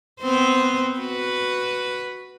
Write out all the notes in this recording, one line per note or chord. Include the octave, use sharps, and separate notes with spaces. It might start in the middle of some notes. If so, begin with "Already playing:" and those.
B3 C4 C5
F#4 B4